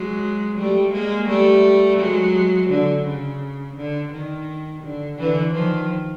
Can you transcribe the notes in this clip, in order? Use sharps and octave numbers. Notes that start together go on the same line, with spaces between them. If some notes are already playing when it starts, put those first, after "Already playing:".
Already playing: F#3 G#3
G3 A3
G#3 A#3
G3 A3
F#3 G#3
D3
C#3
D3
D#3
D3
D3 E3
D#3 F3